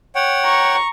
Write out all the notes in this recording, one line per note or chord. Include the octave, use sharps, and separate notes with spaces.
C#5 F#5 G5
A#5 C#6